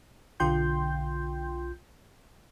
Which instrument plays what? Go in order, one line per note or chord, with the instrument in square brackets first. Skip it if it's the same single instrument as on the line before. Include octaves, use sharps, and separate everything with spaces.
[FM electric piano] B1 D3 F4 G5 C6 G6